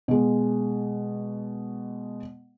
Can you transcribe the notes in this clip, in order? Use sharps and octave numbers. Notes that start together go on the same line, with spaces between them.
B2 G#3